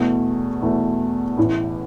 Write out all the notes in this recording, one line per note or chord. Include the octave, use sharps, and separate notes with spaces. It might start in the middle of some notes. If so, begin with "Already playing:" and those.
Already playing: E2 B2 A3
E2 B2 A3
A1 A2 E3